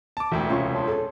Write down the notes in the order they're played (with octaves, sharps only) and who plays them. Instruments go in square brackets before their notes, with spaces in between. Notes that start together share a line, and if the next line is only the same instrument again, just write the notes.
[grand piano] A5 D6
[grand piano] E1 D2 G5 [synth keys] E3 E5 E6 [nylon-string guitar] F#4
[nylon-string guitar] C3 C#4 F4 [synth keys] E5 C6 C#6
[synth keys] C#5 A5 C6
[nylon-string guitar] G#4 A4